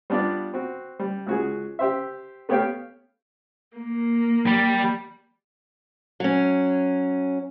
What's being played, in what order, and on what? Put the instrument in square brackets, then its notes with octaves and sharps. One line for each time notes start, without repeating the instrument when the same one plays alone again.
[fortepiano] G3 B3 D4 F4 D5
C4 F#4
G3
C#2 F#4 G#4
G4 C5 E5
A3 B3 G4 C#5 F5 G5
[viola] A#3
[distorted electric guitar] G3
[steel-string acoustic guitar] F#3 C#4